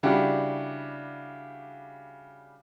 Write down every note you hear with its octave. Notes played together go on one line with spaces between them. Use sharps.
C#3 G3 D4 E4 F#4 G4